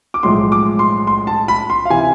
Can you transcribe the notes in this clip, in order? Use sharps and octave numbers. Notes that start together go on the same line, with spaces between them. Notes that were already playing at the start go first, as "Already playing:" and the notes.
D6
B1 A2 F3 G#3 C6
D6
C6
C6
A5
B5
C6
F5
C3 E3 G#5